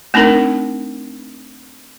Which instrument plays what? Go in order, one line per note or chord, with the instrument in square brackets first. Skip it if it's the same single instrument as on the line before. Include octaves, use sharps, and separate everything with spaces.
[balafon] A3 C4 D4 D#4 A#4